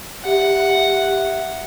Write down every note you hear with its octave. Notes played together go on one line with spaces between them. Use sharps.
G4 E5 F#5